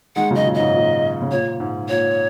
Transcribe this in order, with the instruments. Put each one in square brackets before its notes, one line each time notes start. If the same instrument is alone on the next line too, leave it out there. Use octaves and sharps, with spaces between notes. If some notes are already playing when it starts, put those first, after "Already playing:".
[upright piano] D#3 G#3 [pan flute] F#5
[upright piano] C#3 F#3 [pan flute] D#5
[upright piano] A#2
[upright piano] G#2 [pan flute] D#5
[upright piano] A#2
C#3
[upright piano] A#2 [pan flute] C#5
[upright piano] G#2
[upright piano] A#2 [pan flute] C#5